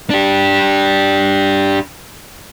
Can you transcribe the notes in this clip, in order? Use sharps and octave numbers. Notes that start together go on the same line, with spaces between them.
D4 G4